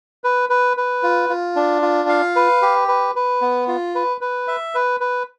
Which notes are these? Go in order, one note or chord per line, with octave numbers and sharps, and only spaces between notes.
B4
B4
B4
F4
F4
D4
F4
F5
B4
G4
B4
B4
B3
F4
B4
B4
E5
B4
B4